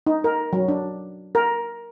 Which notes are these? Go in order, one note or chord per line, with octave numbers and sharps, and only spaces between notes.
D#4
A#4
F#3
D4
A#4